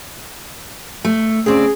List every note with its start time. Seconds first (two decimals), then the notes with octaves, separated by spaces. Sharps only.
1.05 A3
1.46 C#3 C4 G#4 D5